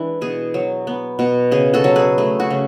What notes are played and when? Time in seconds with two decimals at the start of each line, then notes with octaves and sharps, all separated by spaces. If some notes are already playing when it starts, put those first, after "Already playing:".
Already playing: E3 G#3 D4
0.21 B2 G#4
0.54 F#3
0.87 B3
1.19 B2
1.51 C#3 G#4
1.74 F#4 A4
1.84 F#3
1.96 G#4 B4
2.18 A3 G#4
2.40 F#4
2.51 C#3